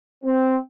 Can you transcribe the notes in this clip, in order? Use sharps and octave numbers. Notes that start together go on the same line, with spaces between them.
C4